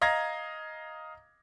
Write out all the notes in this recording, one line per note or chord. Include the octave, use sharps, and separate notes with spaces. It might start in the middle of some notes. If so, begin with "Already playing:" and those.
D#5 F5 A#5 G#6 A#6